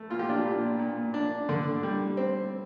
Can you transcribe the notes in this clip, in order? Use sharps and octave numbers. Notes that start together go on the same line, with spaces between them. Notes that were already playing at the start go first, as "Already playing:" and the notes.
Already playing: A3
A#2 F4
G4
D4 F4
A#2
A#2
D4
D3
G3
C4